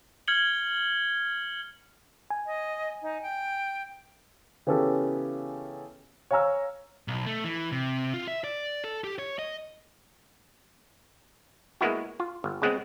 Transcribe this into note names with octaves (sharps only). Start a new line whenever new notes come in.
F6 G#6 C#7 F#7 G7
G#5
D#5
D#4
G5
C#3 E3 B3 C#4 G4 A4
C#5 F5 G#5 A#5 E6 F6
B1
A3
E3
C3
F4
E5
D5
A4
G4
C#5
D#5
G#3 A#3 B3 E4 F#4
F4
G1
C#3 G#3 B3 C4